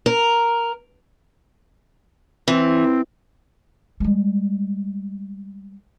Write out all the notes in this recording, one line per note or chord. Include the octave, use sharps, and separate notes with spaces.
A#4
E3 C4
G3 G#3